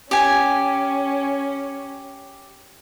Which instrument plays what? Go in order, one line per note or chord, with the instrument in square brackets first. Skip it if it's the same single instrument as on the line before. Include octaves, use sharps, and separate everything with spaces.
[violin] C#4 [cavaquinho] G4 G#5